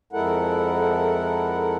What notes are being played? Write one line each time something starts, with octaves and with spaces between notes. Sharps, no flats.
F2 G#3 E4 A4 A#4 F#5